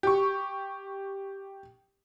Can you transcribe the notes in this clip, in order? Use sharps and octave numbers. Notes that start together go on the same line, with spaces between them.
G4 C#6